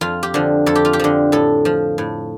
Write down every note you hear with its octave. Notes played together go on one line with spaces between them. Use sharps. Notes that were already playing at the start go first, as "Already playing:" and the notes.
F2 F4
G4
D3 F3
F2 A4
G4
F4
G4
D3 F3
A2 A4
F3
A2